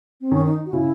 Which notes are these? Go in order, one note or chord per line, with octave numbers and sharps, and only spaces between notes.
C4
D#3 C#4
D#4
F#4
C#3 E4